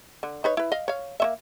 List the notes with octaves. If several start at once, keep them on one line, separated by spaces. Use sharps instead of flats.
D3
D#4 B4 C#5
E4 B4
D#5 F5
C#5 F5
A#3 C#4 E5